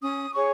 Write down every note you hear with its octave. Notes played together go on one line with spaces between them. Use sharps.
C#4 D#6
G#4 C#5 C#6